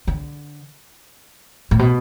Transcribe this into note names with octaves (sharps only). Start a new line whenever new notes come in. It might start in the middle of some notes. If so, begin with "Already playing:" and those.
D3
A2
B2